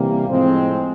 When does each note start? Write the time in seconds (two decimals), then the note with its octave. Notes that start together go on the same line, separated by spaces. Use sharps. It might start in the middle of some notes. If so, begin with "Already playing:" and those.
Already playing: C3 E3 G3 A#3
0.29 A2 F3 G#3 C4